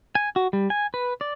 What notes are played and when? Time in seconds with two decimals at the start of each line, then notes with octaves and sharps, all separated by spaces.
0.15 G#5
0.36 F#4
0.53 G3
0.70 G#5
0.94 B4
1.21 D5